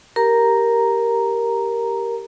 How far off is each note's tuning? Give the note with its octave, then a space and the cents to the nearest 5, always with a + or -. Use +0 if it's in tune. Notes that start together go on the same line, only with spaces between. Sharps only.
G4 +0 A#4 +0 A#5 +0